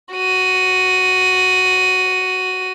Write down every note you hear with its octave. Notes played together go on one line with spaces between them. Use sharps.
F#4 D#7